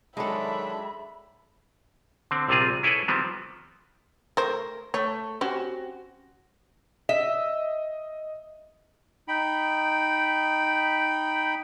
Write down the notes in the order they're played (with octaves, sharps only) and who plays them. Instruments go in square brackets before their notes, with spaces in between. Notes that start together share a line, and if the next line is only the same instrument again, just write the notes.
[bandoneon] D#3 F#3 D4 [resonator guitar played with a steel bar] G#3 A4 [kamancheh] E5 [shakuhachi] B5
[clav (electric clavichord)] D3 C4
A#1 C3 G3 C4 F4 G#4
C#4 E4 G#4 A4 B4
D#3 F3 G3 B3 C4
[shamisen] A3 C5 [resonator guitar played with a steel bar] A#4
[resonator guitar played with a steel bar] A3 [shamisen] C#5
[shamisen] C4 C#4 G4 [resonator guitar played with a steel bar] F#4
[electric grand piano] D#5 [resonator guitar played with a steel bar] E5
[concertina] D#4 G5 B5